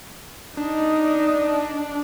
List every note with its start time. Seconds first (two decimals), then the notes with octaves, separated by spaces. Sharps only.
0.57 D4 D#4 D#5